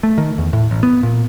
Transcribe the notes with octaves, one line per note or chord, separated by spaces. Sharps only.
A3
D#3
E2
A2
A1
B3
A#2